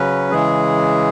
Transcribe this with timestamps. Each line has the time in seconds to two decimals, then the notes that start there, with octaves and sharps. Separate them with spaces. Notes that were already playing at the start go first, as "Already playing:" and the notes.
Already playing: C#3 F#3 C#4 B4
0.31 C#3 E3 G#3 G#4